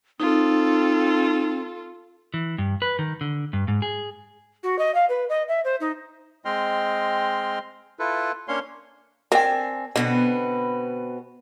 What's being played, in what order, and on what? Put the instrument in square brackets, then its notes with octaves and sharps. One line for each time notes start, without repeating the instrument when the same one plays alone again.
[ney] C4 [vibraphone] D#4 [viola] F4 A4
[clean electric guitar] E3
G2
B4
D#3
D3
G2
G#2
G#4
[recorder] F#4
D#5
F5
B4
D#5
E5
C5
D#4
[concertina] G#3 C4 D#5 G5 C6 F6
E4 F4 A4 B4
A#3 C#4 D4 C#5 F5 C6
[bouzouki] C4 D4 G#5 [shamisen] A#4 G5
[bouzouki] B2 B3 C4 [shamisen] D3